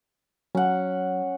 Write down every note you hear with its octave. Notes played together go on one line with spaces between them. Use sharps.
F#3 C#4 F#5